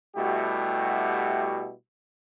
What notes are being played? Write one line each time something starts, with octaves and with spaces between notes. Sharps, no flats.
B2 G3 A3 E4 F#4 G4